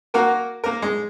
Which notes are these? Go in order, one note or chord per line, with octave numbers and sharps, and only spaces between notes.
A#3 F#4 A#4
A#3 A#4
G#3